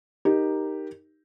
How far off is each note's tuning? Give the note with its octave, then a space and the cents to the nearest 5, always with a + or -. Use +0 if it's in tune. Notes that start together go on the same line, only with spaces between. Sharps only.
D#4 -5 G4 +0 A#4 +0